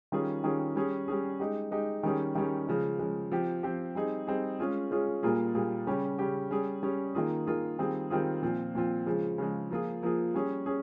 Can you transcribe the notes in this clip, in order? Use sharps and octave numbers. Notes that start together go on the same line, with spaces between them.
D#3 G3 C#4 F4 G#4
D#3 G3 C#4 F4 G#4
G3 C#4 G#4
G3 C#4 G#4
G#3 D#4 G4
G#3 D#4 G4
D#3 G3 C#4 G#4
D#3 G3 C#4 G#4
C#3 F3 G#3
C#3 F3 G#3
F3 C4 G4
F3 C4 G4
G3 C4 D#4 G#4
G3 C4 D#4 G#4
G#3 C#4 F4 G#4
G#3 C#4 F4 G#4
A#2 G3 A#3 F4 G#4
A#2 G3 A#3 F4 G#4
C#3 G3 C#4 G4
C#3 G3 C#4 G4
G3 C#4 G#4
G3 C#4 G#4
D#3 A#3 F4 G#4
D#3 A#3 F4 G#4
D#3 G3 C4 F4 G#4
D#3 G3 C4 F4 G#4
A#2 F3 C4 F4
A#2 F3 C4 F4
C#3 F3 G#3
C#3 F3 G#3
F3 A#3 F4 G#4
F3 A#3 F4 G#4
G3 C#4 G#4
C#4 G#4